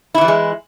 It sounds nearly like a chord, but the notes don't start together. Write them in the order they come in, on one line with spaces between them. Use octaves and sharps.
E4 D3 E3 G3 G#3